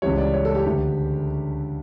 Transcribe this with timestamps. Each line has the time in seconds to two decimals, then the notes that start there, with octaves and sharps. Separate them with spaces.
0.02 C#2 C#3 E3 G3 C#5
0.18 D5
0.33 C#5
0.45 A4
0.55 G4
0.66 D2 D3 A3